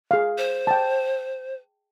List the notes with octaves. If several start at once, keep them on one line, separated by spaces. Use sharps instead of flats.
G#4 F5
C5
G5 A5